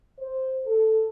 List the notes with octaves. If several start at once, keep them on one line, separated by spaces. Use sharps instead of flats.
C5
A4